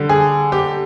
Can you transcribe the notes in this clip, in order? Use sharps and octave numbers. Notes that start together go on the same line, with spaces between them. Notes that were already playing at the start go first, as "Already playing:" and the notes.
Already playing: D3 G3
G#4
G4